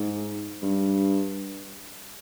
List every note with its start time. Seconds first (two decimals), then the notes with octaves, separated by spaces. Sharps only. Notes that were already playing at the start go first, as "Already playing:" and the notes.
Already playing: G#2
0.62 G2